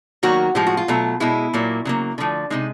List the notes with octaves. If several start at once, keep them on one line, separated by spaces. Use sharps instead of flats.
D#3 F#3 A#3 F#4
A2 F3 G#3 G4
F#4
F4
B2 F#3 A3
B2 G#3 E4
A#2 F#3 A#3
C#3 F#3 A#3
D3 F3 A3
C3 F3 G#3 D#4